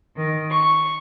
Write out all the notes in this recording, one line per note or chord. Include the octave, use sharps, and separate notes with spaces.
D#3
C#6